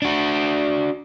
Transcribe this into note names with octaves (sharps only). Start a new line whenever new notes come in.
D4 F#4